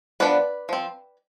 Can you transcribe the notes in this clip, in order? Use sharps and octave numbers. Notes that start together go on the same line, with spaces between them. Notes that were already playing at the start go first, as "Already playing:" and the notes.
F3 B3 D4 B4 D5
F3 C4